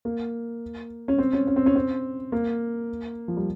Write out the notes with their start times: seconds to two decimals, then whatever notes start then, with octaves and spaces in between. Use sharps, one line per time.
0.05 A#3
1.08 C#4
1.18 C4
1.33 C#4
1.47 C#4
1.56 C4
1.66 C#4
1.76 C4
2.32 A#3
3.28 F3
3.37 G3